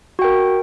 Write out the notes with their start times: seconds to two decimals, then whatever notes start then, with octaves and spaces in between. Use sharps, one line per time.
0.19 F#4
0.22 G5
0.24 A#4